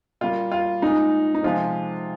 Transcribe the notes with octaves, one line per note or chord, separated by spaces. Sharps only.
A#2 G3 A#3 F4
F4
A#2 G#3 D#4
D#4
C3 F3 G#3 F4